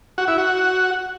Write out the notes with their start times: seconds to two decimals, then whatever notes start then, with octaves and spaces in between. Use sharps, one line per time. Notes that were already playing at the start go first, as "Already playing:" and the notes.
0.18 F#4
0.28 E4
0.38 F#4